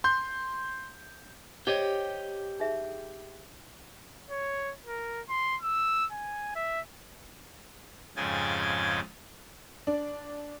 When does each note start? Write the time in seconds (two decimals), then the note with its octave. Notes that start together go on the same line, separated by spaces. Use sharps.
0.04 C6 G6
1.67 G4 C5 C#5 D#5
2.60 D#4 G#4 E5
4.30 C#5
4.85 A#4
5.29 C6
5.62 E6
6.12 G#5
6.55 E5
8.16 F2 G#2 C#3 G5 G#5 A6
9.87 D4